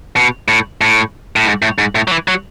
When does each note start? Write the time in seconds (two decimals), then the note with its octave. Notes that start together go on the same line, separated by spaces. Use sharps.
0.17 B2
0.48 A2
0.81 A2
1.36 A2
1.46 G#2
1.62 A2
1.79 G#2
1.95 A2
2.08 F#3
2.11 E3
2.28 F#3